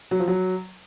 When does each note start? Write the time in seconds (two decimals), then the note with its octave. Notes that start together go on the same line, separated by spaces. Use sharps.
0.11 F#3
0.19 F3
0.28 F#3